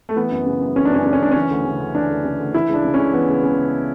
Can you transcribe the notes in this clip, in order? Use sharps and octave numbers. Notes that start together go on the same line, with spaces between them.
A3
E3 B3
F#2
C#3
F#2
E3 C#4
D4
F#2 C#4
C#3 D4
C#4
F#2 D4
E3 C#4
D2
C#3
D2
E3 D4
D2
C#3
D2
E3 E4
C#2
D4
C#3
C#2 C#4
E3 B3
C#2
C#3
C#2